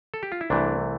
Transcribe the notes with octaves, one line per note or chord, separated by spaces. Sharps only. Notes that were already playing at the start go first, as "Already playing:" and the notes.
A4
G4
F4
E4
C2 C3 E3 A3 D4